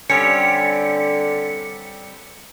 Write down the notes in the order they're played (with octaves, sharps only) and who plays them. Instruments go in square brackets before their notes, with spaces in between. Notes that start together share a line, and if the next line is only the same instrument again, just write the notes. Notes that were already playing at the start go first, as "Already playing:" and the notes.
[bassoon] D3 [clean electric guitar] G3 C4 G4 [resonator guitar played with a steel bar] C#4 [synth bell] C#7